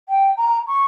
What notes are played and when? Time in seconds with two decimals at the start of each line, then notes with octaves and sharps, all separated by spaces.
0.08 G5
0.37 A#5
0.67 C#6